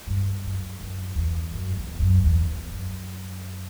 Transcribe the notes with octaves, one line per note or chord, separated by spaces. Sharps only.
G2
F#2
F#2
E2
F#2
E2
F#2
E2
E2
F#2